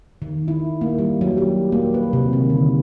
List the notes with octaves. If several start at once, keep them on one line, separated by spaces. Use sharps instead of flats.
D#3
E4
A#3
G3
F#3
G4
A#3
B4
C3
D#3
D3